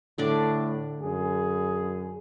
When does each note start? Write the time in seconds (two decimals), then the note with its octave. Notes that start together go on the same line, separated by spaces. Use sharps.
0.18 A2 D3 D4 D5
1.02 F#2 G#4